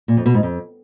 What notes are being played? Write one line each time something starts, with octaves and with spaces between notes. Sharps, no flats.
A#2
F2
B2
G#2
F2